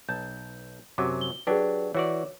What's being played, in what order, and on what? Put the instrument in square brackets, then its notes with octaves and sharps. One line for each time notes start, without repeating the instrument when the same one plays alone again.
[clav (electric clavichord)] B1 A5 [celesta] G6
[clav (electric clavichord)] F#2 C3 F#3 [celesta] D6
[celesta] G7
[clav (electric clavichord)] F#3 D4 G4 [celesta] G#4 B4
[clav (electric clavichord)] E3 F#4 D5 [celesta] C#5